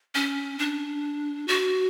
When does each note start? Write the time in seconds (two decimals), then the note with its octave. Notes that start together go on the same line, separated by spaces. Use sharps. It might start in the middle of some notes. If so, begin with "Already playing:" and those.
0.15 C#4
0.59 D4
1.48 F#4